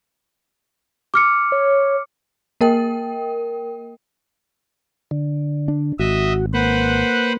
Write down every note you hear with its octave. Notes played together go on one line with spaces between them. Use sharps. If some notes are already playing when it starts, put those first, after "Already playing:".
D6 F6 C#7
C#5
A#3 A#4 G5
D3
D4
G#1 F#4 D#5 E5
A#3 B4 C5 F#5